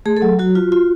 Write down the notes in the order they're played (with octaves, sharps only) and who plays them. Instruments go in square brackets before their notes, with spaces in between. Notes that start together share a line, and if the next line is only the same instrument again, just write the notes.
[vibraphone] A3 G#4
A4
F#3
F#3 F#4
F4
F4